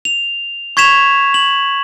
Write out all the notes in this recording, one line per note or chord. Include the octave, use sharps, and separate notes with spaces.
F7
C#6 G#6 B6 E7 F7
F#7